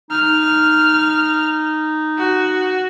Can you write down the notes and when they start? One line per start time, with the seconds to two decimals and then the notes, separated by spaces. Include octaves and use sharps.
0.11 D#4 F6
2.18 F#4